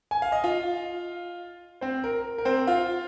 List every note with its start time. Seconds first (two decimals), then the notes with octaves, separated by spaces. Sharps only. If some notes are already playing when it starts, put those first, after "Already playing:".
0.11 G#5
0.22 F5
0.32 D#5
0.44 F4 F5
1.81 C4 C5
2.04 A#4
2.38 A#4
2.45 C4 C5
2.67 F4 F5